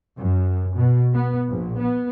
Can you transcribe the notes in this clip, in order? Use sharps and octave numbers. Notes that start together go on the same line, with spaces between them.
F#2
B2
B3
A#1
B3